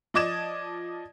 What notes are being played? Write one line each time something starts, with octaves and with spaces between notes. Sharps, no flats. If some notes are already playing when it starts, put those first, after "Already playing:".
F3 D5 D#5 D6 G#6 E7